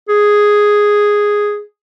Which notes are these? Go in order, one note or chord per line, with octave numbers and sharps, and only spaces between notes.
G#4